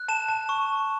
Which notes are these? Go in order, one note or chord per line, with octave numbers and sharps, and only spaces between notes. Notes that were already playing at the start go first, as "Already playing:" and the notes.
Already playing: F#6
A5 E7
A5
C#6